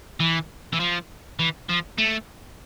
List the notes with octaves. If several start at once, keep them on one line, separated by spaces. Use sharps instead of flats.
E3
E3
F3
E3
F3
A3